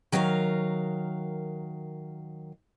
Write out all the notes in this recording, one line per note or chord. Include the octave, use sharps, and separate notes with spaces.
D#3 F#3 A#4 C#5 F5